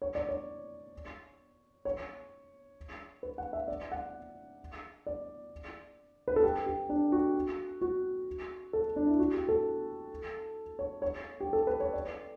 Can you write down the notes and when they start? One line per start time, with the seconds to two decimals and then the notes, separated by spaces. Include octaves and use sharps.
0.02 C#5
0.15 D5
0.29 C#5
1.85 C#5
3.23 B4
3.38 F#5
3.53 E5
3.68 D5
3.92 F#5
5.07 D5
6.28 B4
6.36 A4
6.44 G4
6.66 G4
6.89 D4
7.12 F#4
7.81 F#4
8.73 A4
8.96 D4
9.07 E4
9.19 F#4
9.34 G4
9.49 A4
10.79 C#5
11.02 C#5
11.40 G4
11.53 A4
11.67 B4
11.80 C#5
11.93 D5